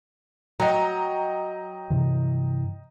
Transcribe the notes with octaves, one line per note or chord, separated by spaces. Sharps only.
F#3 D#5 G5 A#5
G2 C3 E3